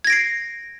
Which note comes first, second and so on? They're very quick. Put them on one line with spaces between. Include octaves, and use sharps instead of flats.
G#6 A#6 D7 C7